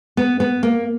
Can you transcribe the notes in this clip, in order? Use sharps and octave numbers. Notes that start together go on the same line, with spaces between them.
B3
B3
A#3